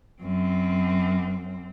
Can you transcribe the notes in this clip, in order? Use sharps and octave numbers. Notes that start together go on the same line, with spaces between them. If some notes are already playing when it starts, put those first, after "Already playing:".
F#2 C4